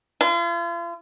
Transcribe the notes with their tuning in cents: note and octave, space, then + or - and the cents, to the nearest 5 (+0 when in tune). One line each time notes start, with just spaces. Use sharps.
F4 -40